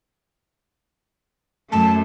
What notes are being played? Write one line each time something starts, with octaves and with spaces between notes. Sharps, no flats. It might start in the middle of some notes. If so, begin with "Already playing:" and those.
F#2 A3 A5